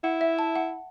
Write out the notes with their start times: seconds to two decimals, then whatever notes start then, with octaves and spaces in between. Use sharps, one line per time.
0.04 E4 F#5
0.21 E5
0.39 A5
0.56 F#5